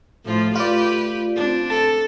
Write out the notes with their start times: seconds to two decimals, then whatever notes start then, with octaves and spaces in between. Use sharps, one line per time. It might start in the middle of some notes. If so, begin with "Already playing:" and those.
0.25 A2 F3 F4
0.55 A3 F4 G4 B4 D5
1.36 C4 D4
1.70 A4 A5